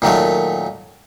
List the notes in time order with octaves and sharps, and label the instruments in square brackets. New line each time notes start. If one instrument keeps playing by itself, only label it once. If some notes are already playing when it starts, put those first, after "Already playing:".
[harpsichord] A#2 D#3 F#3 A3